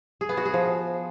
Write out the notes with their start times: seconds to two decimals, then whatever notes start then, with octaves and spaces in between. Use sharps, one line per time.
0.21 G#4
0.29 B3
0.37 F#4
0.45 G#4
0.54 F3